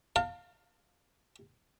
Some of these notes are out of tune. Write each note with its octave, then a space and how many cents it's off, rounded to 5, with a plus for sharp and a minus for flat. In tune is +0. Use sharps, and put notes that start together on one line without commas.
F5 +15 A5 +45